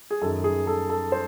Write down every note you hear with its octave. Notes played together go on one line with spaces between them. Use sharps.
G#4
F#2 D#3 A4
G#4
A4
A4
C5